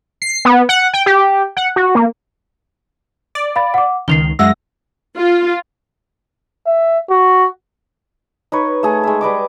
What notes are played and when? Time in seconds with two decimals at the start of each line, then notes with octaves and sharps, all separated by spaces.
0.22 C7
0.45 B3
0.69 F#5
0.94 G5
1.06 G4
1.57 F#5
1.76 F#4
1.95 A#3
3.35 D5
3.56 F5 B5 A6
3.74 F#5 D6
4.08 C#2 D#3 C7 F7 G7
4.39 F#2 G#3 E5 F#5 E6 A#6
5.17 F4
6.66 E5
7.10 F#4
8.52 D#4 B4 C#5
8.83 A3 G#4
9.03 G#3 E5
9.21 G3 B4 D#5 D6